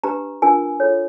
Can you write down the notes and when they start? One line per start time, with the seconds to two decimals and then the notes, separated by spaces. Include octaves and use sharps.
0.04 D4 G4 B4 A#5
0.42 D4 F4 A#4 G#5
0.80 F4 A4 C#5